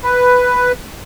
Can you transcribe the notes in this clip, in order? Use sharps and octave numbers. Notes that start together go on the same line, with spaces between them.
B4